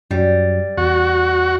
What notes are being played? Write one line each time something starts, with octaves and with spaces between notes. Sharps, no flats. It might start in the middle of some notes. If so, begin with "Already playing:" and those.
F#2 F#3 G3
E2 F#4